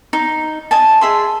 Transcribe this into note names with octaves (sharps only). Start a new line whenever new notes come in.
D#4
D#5 G#5 A5
G#4 E5 C6